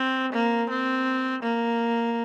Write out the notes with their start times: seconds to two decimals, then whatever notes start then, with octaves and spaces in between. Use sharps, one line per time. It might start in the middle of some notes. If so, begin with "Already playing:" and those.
Already playing: C4
0.33 A#3
0.69 C4
1.43 A#3